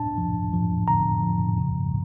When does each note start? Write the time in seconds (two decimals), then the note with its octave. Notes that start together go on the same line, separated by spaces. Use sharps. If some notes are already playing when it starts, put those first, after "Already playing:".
Already playing: D4 A5
0.18 F3
0.53 F3
0.88 D3 A#5
1.23 F3
1.58 C#3